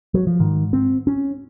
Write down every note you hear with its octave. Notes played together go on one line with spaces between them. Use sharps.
F#3
F3
G#2 D#3
C4
C#4